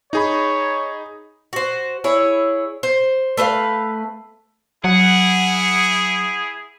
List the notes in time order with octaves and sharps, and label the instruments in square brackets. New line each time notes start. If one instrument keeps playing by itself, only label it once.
[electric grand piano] D#4 G#4 B5 [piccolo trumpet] C#5
[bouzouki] F#4 C5
E4 G#4 C#5
C5
A3 B4 E5 F5
[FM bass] F#3 [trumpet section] E4 G#4 [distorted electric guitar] F#5